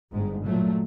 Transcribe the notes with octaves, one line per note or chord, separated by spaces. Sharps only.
G1 G#2
A#2 F#3 A3